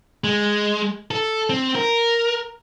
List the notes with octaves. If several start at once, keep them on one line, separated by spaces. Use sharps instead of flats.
G#3
A4
C4
A#4